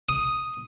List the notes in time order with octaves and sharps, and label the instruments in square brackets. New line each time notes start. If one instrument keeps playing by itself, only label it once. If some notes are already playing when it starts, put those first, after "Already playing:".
[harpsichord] D#6